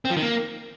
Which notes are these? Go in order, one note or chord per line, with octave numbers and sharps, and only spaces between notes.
C4
F3
D#3
A#3